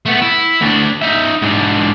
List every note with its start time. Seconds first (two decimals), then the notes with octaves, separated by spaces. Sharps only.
0.06 A3 B3
0.22 E4
0.61 D2 D4
1.02 D#4 E5
1.42 G#2 D3